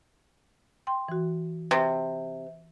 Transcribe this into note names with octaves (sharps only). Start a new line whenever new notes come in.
G5 C6
E3 F#4
C3